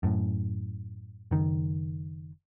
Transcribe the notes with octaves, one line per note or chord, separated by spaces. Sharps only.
F#2 A2
F#1 D#3